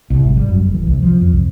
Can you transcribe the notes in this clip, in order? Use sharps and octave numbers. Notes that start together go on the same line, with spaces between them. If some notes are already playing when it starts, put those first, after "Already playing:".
C2
G#1
G3
F#2
F#1
E3
C2
F3
F2
C2